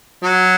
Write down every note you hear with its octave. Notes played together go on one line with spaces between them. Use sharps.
F#3